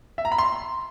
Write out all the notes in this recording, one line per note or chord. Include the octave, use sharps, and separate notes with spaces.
E5
A#5
B5
C6